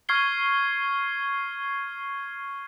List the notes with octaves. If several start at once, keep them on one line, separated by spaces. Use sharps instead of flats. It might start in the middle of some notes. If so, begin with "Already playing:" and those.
C#6 F6 G#6 C7 G7